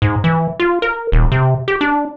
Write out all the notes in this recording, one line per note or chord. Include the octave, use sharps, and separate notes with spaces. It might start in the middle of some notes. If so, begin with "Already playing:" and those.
G#2
E3
F4
A#4
D#1
C3
G4
D4